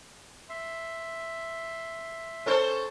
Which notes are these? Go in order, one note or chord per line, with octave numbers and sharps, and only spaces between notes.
E5 C6
C#4 A4 C5